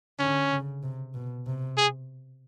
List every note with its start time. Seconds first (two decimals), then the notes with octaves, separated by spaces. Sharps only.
0.19 D3 C#4
0.51 C#3
0.83 C3
1.14 B2
1.46 C3
1.78 G#4